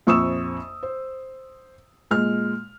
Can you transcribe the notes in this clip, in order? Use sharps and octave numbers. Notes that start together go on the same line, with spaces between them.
A#1 F2 C#6 D#6 E6 E7
C5
A#2 G#3 F6